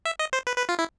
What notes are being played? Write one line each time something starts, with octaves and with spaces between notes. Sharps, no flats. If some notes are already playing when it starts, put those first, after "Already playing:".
E5
D#5
C5
B4
B4
F4
E4